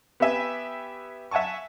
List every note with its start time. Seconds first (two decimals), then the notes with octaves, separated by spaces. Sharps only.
0.20 B3 G4 B4 E5 G5 G#5
1.31 E5 F#5 G#5 A5 C#6